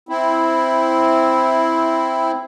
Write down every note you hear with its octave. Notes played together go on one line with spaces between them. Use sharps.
C4 E4